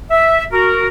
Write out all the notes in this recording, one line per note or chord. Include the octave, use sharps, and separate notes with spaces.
E5
F#4 A#4